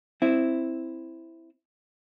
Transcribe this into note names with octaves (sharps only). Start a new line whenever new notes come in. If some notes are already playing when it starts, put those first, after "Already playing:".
C4 E4